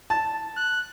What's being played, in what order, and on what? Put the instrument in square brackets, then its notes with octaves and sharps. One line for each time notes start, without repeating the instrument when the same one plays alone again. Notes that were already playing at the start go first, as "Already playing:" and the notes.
[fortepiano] A5
[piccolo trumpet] F#6